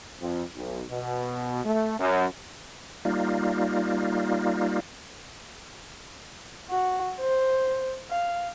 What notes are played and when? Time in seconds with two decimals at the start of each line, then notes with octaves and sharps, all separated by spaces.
0.21 F2
0.57 B1
0.90 B2
1.64 A3
1.99 F#2
3.05 G3 A#3 D#4 F4
6.70 F#4
7.20 C5
8.11 F5